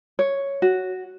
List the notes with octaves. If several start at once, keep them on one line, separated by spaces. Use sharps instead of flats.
C#5
F#4